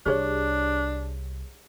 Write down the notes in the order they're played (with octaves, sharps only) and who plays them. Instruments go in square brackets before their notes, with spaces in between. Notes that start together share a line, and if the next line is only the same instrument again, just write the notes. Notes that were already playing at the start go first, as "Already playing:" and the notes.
[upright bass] C2 [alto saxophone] D4 [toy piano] G4 G#4 C#5